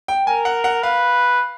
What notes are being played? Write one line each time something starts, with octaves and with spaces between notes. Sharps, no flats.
G5
A#4 G#5
F#5
F#5
B4 F5